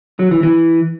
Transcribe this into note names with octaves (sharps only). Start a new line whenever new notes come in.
F#3
E3
E3